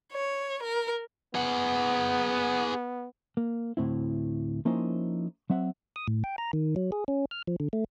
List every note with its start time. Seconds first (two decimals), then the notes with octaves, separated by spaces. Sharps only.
0.12 C#5
0.61 A#4
1.35 B3 G#4 F#5
3.37 A#3
3.77 D2 A2 C4 E4
4.65 F3 A#3 C#4 D#4 E4 C5
5.50 F#3 C4 E5 F#5
5.96 D#6
6.08 A2
6.24 G5
6.38 A#5
6.53 D#3
6.76 F#3
6.92 G#4
7.08 C#4
7.31 F6
7.47 F3
7.60 D3
7.73 A3